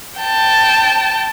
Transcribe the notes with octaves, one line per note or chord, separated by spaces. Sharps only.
G5 A5